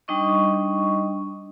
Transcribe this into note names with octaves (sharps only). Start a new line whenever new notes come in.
G3 D4 D#4 D#5 C#6